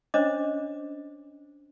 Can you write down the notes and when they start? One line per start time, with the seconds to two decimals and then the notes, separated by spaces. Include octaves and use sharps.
0.14 C#4 D4 C5 C#5 D#5 D6